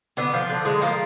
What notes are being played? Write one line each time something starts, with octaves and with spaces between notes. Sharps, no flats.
D3 B3
F3
D3
G#3
F3 A#3